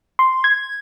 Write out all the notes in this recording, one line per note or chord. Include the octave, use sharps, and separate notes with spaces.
C6
G#6